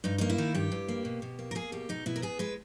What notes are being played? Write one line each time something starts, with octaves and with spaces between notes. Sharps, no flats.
G2 D#4
A#3 D#4
E4
D#3
G2 G4
G2
A#3
B2
B2
A#3
A#4
A#3 G#4
B2 G4
B2 D#4
B2 E4
A#4
B3 G#4
G#3 B4